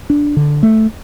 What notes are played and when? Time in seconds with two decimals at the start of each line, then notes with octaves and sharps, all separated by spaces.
0.10 D4
0.36 D3
0.63 A3